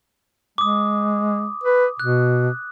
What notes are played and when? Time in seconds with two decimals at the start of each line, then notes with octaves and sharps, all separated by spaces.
0.58 G#3 D6 D#6
1.64 B4
2.00 B2 F#6